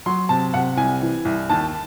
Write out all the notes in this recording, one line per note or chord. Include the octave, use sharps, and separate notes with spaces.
F#3 C6
C3 A5
C3 F#5
C2 G#5
E3
C2
D#2 A5